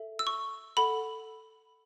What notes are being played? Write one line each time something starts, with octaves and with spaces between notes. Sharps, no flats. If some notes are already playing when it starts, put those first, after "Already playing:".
Already playing: A4 E5
E6
C#6
A4 F#5 B5